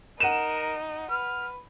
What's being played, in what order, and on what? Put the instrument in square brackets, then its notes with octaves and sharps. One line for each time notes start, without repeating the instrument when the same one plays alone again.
[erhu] D#4 [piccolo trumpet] A#4 [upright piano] F#5 D#7 E7
[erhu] B4 [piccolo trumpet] F6